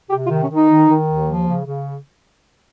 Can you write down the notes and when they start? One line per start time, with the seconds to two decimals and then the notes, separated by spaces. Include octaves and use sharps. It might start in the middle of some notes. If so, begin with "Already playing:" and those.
0.09 C3 G4
0.25 F4
0.29 D#3
0.40 C#4
0.49 D#3
0.54 D#4
0.69 D#3
0.87 D#3
1.07 D#2
1.27 F3
1.47 C#3
1.66 C#3